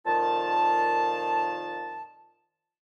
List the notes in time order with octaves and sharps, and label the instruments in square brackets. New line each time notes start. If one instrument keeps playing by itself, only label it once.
[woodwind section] F2 A#2 D#3 F4 A5